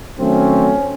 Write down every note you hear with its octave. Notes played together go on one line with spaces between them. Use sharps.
D#3 F#3 A3 C4 C#4